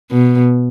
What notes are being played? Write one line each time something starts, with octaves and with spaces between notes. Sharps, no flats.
B2